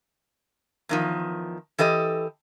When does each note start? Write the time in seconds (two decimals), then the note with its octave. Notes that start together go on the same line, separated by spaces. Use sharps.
0.89 E2 D#3 F3
1.79 E3 G4 A4 D#5